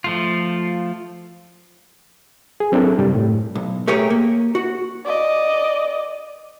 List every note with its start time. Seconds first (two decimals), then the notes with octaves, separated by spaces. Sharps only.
0.04 F3 A3 F4
2.60 G#4
2.72 F#3 C4 D4 E4 A4 A#4
2.99 F#2 C3 G3
3.15 A2
3.55 B1
3.87 A3 G4 G#4 A#4 C#5
4.10 A#3
4.55 F#4
5.06 D5 D#5